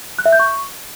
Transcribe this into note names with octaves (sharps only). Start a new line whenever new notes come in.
F#6
E5
G6
C#6